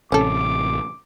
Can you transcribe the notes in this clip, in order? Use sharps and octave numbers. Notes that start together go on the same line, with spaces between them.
A1 C3 C#4 A4 D6